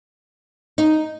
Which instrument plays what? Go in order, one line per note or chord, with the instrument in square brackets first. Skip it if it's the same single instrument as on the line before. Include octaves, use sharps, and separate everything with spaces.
[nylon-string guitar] D#4